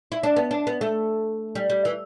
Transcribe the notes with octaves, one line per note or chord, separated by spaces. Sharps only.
E4
D4
B3
D4
B3
A3
G3
G3
E3